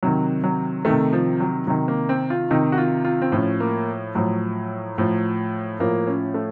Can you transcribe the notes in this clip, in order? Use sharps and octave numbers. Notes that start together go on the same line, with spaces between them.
C3 D#3 F#3
F#3
D#3 A3
C3
F3
F#3
C3 D#3 F#3
A#3
C4
F4
C3 D#3 D#4
F#4
F4
F4
C4
A2 F3 C#4
A#3
A2 F3 F#3
A2 F3
A2 F3 A#3
C#4
A3